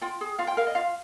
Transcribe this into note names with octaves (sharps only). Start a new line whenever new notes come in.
F4 G5
G#4
F4 F5
G5
A#4 F5
D#5
F4 F5